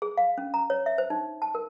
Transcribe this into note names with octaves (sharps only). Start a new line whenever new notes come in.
G#4
F5
C#4
A#5
C#5
E5
C5
D#4
A5
A#4